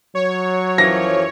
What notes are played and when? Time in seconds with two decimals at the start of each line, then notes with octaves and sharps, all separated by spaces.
0.15 F#3 C#5
0.78 F#2 E3 F3 A#6